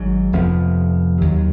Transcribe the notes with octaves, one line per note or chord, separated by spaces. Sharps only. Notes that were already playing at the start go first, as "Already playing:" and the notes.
Already playing: G#1 G#2 F#3
F1 F2 F3 B3
D#2 D#3 F#3